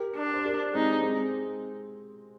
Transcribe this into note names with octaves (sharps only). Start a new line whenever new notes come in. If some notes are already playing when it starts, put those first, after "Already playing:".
Already playing: G4 A#4
D4
C5
G4 A#4
G#3 C4 D#4
G#3 C4